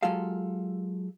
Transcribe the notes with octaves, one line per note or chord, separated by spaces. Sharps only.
F#3 G#3 F4 G4 A4 F5